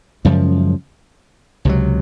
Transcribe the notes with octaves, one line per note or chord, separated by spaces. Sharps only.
F#2 C#3 F3 G#3
C#2 C3 F#3